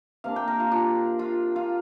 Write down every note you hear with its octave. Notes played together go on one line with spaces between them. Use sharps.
C3 A#3 D4 F5
G5
A#4
F4
D4
F4
F4